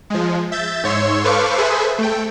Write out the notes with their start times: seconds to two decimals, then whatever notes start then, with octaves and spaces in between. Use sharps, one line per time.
0.10 F3 G#3
0.52 E5 G6 A6
0.84 G#2 C#5 C6 E6
1.24 A4 B4 C5 F5 C#6 D6
1.58 G#4 A4 B4 C5 E5
1.98 A3 G5